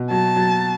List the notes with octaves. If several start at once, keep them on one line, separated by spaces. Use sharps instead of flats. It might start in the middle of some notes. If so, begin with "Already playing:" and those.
Already playing: B2
F#3 A5
F#3